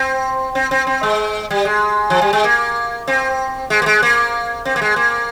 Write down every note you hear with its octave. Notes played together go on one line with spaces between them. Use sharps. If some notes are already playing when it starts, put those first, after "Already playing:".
Already playing: C4
C4
C4
C4
G#3
G3
G#3
F3
G3
G#3
A#3
C4
G#3
A#3
G#3
A#3
C4
A#3
G#3
A#3